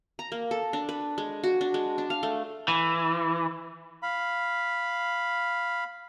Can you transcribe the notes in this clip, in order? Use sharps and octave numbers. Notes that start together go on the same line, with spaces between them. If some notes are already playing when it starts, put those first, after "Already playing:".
A#5
A#3
A4
D4
B4
G#3
F#4
D4
G#3
D4
F5
A3
E3
F5 B5